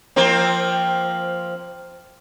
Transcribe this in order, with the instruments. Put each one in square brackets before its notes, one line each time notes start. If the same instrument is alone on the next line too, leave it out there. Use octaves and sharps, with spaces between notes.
[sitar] F3 A#3 C4